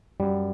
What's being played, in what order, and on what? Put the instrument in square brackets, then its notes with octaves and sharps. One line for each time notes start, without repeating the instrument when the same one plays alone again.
[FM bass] F#2 [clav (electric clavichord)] G3